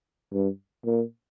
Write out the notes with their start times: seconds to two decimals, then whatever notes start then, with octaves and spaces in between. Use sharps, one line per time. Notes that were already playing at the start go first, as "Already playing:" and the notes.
0.33 G2
0.86 A#2